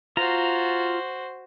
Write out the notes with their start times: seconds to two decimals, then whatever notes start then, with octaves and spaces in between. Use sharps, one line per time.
0.17 F4 F#4 C5 A#5